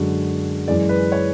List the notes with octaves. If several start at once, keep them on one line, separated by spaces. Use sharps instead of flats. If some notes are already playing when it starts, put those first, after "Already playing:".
Already playing: F#2 D3 G#3 F#4
F#2 E3 G#3 D5
B4
C#5